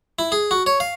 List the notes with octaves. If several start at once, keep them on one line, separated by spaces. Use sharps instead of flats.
E4
G#4
F#4
C#5
F5